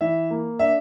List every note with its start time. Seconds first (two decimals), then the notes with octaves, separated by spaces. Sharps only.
0.01 E3 E5
0.30 A#3
0.59 D4 E5